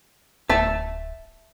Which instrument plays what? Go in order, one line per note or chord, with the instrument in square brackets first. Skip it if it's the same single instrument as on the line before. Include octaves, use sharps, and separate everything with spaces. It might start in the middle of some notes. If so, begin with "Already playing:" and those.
[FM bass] D1 [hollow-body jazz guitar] E5 A5